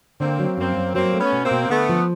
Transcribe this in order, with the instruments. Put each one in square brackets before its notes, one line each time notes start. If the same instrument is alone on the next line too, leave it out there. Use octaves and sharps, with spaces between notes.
[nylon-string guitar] D3 [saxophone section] A#3 C4
[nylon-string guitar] F#3
[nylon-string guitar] F#2 [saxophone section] A#3 C4
[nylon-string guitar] F#2
[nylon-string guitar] F#3 [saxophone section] A#3 C4
[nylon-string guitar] A3
[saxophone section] B3 C#4
[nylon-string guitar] B2
[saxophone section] A#3 C4
[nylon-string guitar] B2
[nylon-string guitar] D3 [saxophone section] A3 B3
[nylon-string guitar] F3